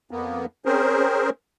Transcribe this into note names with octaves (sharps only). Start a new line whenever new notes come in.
F2 A#3 B3
C4 C#4 G#4 A#4 C5